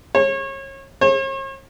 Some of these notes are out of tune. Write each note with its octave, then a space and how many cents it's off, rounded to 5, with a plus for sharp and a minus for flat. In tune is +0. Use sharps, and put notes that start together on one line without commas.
C#5 -30
C#5 -45